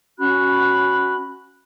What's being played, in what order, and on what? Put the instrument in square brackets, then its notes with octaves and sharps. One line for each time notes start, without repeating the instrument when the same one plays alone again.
[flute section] C#4 F#4 B5 F#6